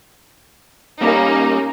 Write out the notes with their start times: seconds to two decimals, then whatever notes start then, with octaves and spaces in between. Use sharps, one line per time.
1.02 A#2 G3 A#3 C#4 D#4